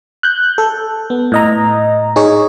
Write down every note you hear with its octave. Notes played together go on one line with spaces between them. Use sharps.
F#6 G6
A4
B3
A2 D#5 A#5
D#4 G#4 C#5